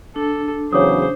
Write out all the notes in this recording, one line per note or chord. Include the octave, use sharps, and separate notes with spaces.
D4 A4
E2 C#3 F#3 C5 C#5 D6 D#6